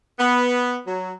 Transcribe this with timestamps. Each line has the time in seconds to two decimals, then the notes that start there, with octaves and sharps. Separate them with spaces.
0.19 B3
0.87 F#3